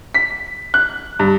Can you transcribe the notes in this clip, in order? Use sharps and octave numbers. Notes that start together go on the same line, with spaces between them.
B6
F#6
G2